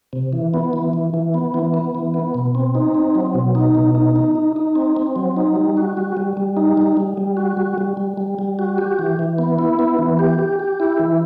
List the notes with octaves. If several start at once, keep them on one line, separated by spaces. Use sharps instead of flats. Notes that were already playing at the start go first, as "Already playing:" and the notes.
C3
E3
B3
E3
E3
E3
B3
E3
B3
E3
B3
B2
C4
D#4
C4
F#3
B2
D#4
B2
D#4
D#4
D#4
D#4
C4
C4
F#3
D#4
G3
F#4
G3
G3
G3
D#4
G3
G3
G3
F#4
G3
G3
G3
G3
G3
F#4
G4
E3
E3
B3
E4
B3
E3
G4
G4
G4
E4
E3